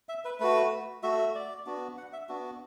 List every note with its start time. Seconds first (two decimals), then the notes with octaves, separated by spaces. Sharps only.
0.09 E5
0.25 B4
0.40 A3 F#4 B4
1.03 A3 F#4 E5
1.19 E5
1.35 D5
1.66 B3 D4 F#4
1.98 F#5
2.13 E5
2.29 B3 D4 F#4